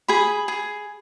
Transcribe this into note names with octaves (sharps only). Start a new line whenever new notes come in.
G#4 B5
G#4